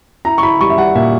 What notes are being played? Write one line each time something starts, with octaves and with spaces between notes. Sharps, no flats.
E4 A#5
C#6
E4 B5
G3 C#6
E5
G3 F#5
A#2 E5